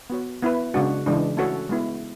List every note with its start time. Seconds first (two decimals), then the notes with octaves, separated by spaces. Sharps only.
0.10 B3 F#4 C#5
0.42 B3 E4 B4
0.74 C#3 G#3 D4 F#4
1.06 C#3 E3 G#3 D4
1.37 A3 C#4 F#4 A4 C#5
1.69 G#3 B3 E4